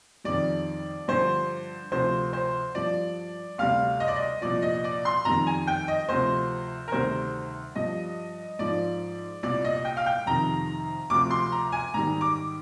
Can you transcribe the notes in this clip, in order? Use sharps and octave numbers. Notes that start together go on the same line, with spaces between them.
F2 D#3 G3 D5
G2 D3 F3 C5
D2 C3 F3 C5
C5
G2 F3 D5
D2 C3 G3 F5
D#5
D5
D#5
C2 A#2 F3 D5
D#5
D5
C6
F2 D#3 G3 A#5
G#5
G5
D#5
D2 C3 F3 C5
A#4
D2 C3 D#3 G3 C5
G2 F3 D#5
G#2 F3 D5
C2 A#2 G3 D5
D#5
G5
F5
G5
F2 C3 D#3 A#5
D2 C3 F3 D6
C6
A#5
G#5
G#2 D#3 G3 A#5
D6